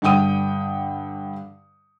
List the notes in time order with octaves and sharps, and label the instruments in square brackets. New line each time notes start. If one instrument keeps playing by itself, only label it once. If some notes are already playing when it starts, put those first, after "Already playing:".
[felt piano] G2 D3 F#5 G5 D#6 D#7